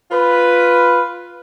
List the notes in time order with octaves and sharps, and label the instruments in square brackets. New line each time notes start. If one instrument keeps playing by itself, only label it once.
[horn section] F4 B4